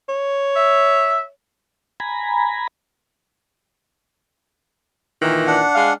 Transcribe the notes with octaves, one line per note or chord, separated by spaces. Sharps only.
C#5
E5
G#5 A#5 B5
A#2 D#3 E3
D4 F#5
G#3 F5